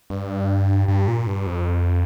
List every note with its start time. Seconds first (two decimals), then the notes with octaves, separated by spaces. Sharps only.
0.10 G2
0.88 G2
1.08 A#2
1.27 G2
1.47 F2